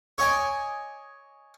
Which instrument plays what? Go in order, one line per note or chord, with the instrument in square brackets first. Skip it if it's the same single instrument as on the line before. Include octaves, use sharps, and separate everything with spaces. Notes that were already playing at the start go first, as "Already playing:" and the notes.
[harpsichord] C#5 D#5 G#5 D6